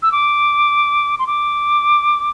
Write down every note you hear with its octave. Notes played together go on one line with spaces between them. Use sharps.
E6
D6
C6
D6